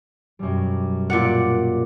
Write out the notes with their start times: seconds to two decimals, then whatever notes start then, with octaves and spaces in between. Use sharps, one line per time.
0.39 F#2 B2 G3
1.10 A#2 D5 F#5